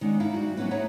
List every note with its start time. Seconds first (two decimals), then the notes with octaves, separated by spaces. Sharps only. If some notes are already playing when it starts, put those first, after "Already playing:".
0.01 D#3 G#3 B3 C#4 D4
0.20 D#4 E4 A4 E5 F5
0.34 G3 F#4
0.57 F#3 A#3 B3 C#4 E4 B4
0.71 D#4 E4 G#4 B4 C#5 E5